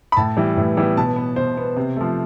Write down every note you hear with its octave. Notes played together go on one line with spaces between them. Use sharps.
B5
A2 A5
E3 G3 B3
A2
E3 G3 B3
B2 A5
B3
B2 C5
B3
C3
F3 A3